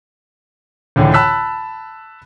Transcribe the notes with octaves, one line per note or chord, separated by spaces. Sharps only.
C#2 A2 D3 E3
A5 B5 E6 F#6 B6